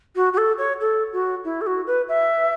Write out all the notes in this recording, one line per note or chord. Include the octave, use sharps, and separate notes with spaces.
F#4
F#4
A4
C#5
A4
F#4
E4
A4
F#4
B4
E5